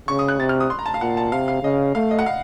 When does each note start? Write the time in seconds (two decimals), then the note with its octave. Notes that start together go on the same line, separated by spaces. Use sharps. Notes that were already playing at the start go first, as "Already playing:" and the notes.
0.08 C#3 C#6
0.19 D#6
0.28 F#6
0.39 C3 A6
0.49 F6
0.60 D#6
0.70 C6
0.79 A#5
0.86 A5
0.94 F5
1.01 A#2 F#5
1.17 A5
1.32 C3 F5
1.48 F5
1.63 C#3 D#5
1.95 A3 F5
2.11 D#5
2.19 F#5
2.26 F5